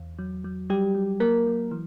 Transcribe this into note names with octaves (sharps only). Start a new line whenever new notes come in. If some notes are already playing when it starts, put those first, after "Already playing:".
Already playing: E2
F#3
F#3
F#3 G3 G4
F#3
F#3 A#3 A#4
F#3
E3